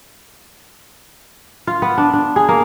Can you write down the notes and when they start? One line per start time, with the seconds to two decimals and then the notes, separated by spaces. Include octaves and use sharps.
1.67 F4
1.82 B3
1.98 D4
2.13 D4
2.36 G#4
2.49 A#3